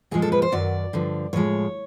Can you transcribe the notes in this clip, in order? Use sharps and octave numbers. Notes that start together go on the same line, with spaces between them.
A#2 F3 G#3 G#4
A4
B4
C5
F#2 D#3 F#3 D5
G2 D3 F3
A2 F3 G#3 C#5